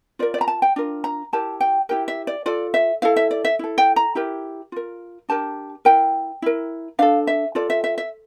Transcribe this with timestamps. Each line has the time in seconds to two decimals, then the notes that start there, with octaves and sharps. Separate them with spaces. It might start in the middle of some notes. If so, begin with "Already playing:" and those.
0.19 F4 A#4 D5
0.34 D5
0.41 A#5
0.48 A5
0.62 G5
0.76 D4 F4 A#4
1.04 A#5
1.33 E4 G4 A#4 A5
1.61 G5
1.89 E4 G4 A#4 G5
2.08 E5
2.27 D5
2.46 F4 A4 D5
2.74 E5
3.02 E4 A4 F5
3.16 E5
3.31 D5
3.45 E5
3.59 E4 A4
3.78 G5
3.96 A#5
4.15 E4 G4 A#4
4.72 F4 A#4
5.29 D4 G4 A#4 A5
5.85 E4 A#4 G5
6.42 E4 A#4
6.99 D4 A4 F5
7.27 E5
7.55 F4 A4 D5
7.70 E5
7.84 E5
7.98 E5